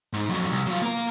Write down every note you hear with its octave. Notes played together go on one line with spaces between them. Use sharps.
G#2
F2 F#3
C2
F#3 F4
A#3 A#4